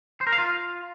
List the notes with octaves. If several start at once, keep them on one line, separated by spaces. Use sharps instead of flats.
C5
A#4
F5
F4